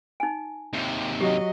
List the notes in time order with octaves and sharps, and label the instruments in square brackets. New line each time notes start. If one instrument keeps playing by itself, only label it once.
[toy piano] D#4 G#5
[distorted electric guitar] D#2 C3
[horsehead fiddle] F#3 D#5 [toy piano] G4